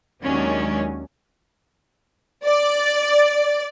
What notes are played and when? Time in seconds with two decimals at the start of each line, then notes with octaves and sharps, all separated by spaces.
0.24 D#2 D#3 F#3 G#3 C#4 D4
2.45 D5